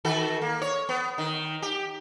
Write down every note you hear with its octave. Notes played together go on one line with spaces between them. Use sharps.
D#3 F#4 A4
A#3
C#5
B3
D#3
G4